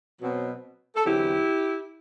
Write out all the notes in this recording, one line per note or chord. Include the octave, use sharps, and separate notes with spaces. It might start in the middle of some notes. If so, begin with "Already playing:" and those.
B2 F#3 C4
A4
E2 D3 F#3 C4 E4 G4